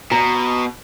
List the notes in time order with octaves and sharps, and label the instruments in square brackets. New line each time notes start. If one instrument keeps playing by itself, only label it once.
[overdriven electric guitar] B2 [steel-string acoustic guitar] A#5